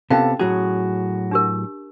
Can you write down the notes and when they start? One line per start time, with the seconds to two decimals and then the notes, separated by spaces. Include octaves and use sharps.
0.10 C3 B3 C#4 F4 A4 F5 G5 A5
0.39 A2 F#3 F#4 G#4
1.31 D4 G4 A#4